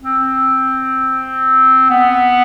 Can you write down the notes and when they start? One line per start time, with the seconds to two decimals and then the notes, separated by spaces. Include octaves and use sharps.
0.02 C4
1.90 B3